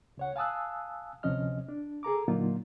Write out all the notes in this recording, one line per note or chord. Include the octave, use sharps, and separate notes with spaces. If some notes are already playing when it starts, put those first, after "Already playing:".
C#2 C#5 F#5
F5 G#5 A5 D#6 E6 F#6
D2 C3 F3 C#4 D#5 F6
D4
G#4 A4 A#5 D6
A#2 D3 F#3 A#3 D#4 F4